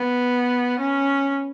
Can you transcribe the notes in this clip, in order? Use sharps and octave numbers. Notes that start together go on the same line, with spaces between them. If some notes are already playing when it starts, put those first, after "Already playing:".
Already playing: B3
C#4